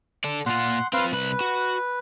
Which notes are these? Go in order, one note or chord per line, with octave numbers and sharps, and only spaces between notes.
A4 D5
A#2 F4 F#5 C6
C4 F4 B4 F5 C6
C2 B4 B5
F#4